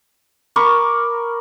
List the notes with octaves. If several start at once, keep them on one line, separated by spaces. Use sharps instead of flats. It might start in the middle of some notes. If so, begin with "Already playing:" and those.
A#4 B5 C#6 D6